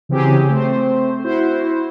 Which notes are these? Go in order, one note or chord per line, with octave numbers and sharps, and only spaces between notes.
C#3 E3 F#3 C4 G4 G#4
A3 C4 C5
E4 F#4 C5